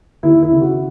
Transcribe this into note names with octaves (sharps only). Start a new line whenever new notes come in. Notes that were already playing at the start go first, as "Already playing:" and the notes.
D#2 E4
E4
C#3
F#4